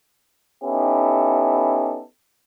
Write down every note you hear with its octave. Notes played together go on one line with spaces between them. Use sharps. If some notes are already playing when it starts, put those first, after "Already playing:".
B3 C#4 D#4 E4 G4 A4